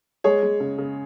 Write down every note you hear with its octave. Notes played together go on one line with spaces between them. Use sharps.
G#3 G#4 C#5
G#3
C#3
C#3